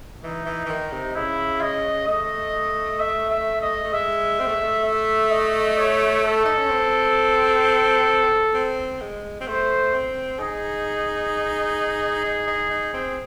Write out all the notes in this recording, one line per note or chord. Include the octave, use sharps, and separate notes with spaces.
E3 D#4
E3
E3
D#3
C3
C#3 E4
D#5
A3 D#5
E5
E5
D#5
A3
G#3 E5
C4
A3
G#3
A3
E5
D#5
C#5
A4
D#4
C#4
C4
C4
G#3
C4
A3 C5
C4
D#4 G#4
D#4
D#4
D#4
C4